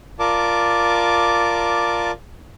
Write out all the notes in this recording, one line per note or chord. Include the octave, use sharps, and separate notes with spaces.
F4 A#4 D5 A5 D6